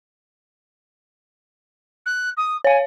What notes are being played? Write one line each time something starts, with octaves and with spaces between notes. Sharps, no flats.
F#6
D#6
C#5 F5 G#5